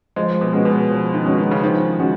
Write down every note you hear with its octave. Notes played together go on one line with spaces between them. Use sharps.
F3 G#3
B2
G#3 C#4 F#4
B2
F3
D#3
G#3 C#4 F#4
D#3
C#3
D#3 F3
G#3 C#4 F#4